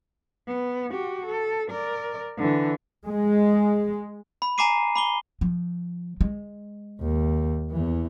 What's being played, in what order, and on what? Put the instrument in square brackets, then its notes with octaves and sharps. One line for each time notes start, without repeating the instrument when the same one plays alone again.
[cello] B3
F#4 G4
A4
A#4 D5
D3 E3
[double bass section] G#3
[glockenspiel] B5
G#5 A#5 B5 D6 C7 D#7
B5 D6 G7
[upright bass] F3
G#3
[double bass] D#2
E2 E3